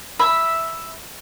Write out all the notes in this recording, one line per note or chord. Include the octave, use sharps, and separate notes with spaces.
E5 B5